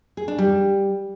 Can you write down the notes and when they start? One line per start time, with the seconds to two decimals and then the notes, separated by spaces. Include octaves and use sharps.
0.17 G#4
0.28 D4
0.38 G3